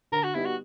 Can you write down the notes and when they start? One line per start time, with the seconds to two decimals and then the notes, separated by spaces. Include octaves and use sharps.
0.12 D3 A#4
0.24 F#4
0.35 G3 B3 D#4 E4 G4
0.45 F#4